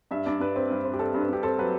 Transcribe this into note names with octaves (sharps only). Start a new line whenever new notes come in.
G2 E5
G2 D5
G2 B4
C4
G2
C4
G4
C4 A4
G2
B4
G2 G4
C4 A4
F#3 B4